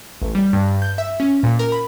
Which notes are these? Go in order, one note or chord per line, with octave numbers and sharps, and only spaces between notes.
A1
G3
G2
G6
E5
C#4
A#2
A#4
B5